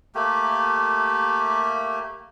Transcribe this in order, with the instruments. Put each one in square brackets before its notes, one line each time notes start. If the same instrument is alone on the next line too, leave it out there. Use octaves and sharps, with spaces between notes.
[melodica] A3 A#3 G4